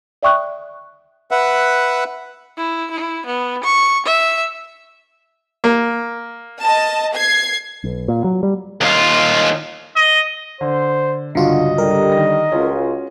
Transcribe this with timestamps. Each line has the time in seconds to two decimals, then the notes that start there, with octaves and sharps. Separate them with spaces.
0.23 D5 E5 G5 C#6 D#6 F#6
1.31 B4 E5 F#5
2.57 E4
2.91 E4
3.26 B3
3.64 C#6
4.06 E5
5.64 A#3
6.60 D#5 A5
7.15 G#6 C7
7.84 B1
8.08 A#2
8.24 F#3
8.43 G3
8.81 D#2 F4
9.96 D#5
10.61 D3 C5
11.35 C#2 G2 D3 F4 F#4 D#5
11.78 D3 G3 A#4
12.12 D#3 A#6
12.52 C#2 C#4 F4 F#4